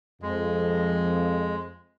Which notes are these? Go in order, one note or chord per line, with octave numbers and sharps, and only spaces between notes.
F2 G#3